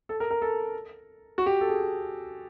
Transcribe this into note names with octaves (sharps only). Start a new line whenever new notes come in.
A4
A#4
A#4
A4
F#4
G4
A4
G#4